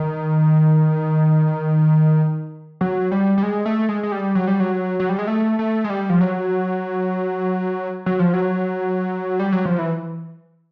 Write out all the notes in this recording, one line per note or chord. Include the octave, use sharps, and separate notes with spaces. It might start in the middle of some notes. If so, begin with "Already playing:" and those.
Already playing: D#3
F#3
G3
G3
G#3
A3
G#3
G#3
G3
F#3
G3
F#3
F#3
G3
G#3
A3
A3
G#3
G3
F3
F#3
F#3
F3
F#3
G3
F#3
F3
E3